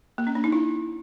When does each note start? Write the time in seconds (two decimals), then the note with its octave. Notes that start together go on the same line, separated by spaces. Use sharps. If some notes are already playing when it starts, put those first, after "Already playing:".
0.18 A#3
0.27 C#4
0.35 D4
0.44 D#4
0.52 E4